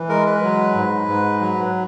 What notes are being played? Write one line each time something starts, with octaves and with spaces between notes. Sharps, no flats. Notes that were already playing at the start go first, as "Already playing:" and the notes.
Already playing: E3
G#3 A#4
B4
F#3
G#2
G#2
F#3